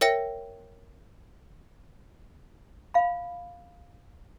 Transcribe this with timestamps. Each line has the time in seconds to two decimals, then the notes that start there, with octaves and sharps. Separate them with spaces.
0.01 A#4 C#5 E5 G5 A#6
2.94 F5 B5